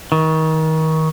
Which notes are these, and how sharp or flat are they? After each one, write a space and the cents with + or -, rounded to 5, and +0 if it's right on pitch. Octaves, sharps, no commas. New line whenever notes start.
D#3 +30